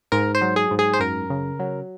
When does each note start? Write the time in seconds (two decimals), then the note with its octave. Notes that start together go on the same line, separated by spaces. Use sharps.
0.12 G#2 A#4
0.35 C5
0.41 F#3
0.56 G#4
0.71 G#2
0.79 G#4
0.93 C5
1.00 F#2 A#4
1.30 C#3
1.59 F#3